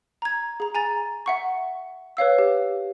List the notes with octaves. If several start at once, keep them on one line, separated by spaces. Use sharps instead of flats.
A#5 G#6
G#4 A#5
G#5 A#5 A6
E5 F#5 C#6
B4 C#5 F5 E6
G4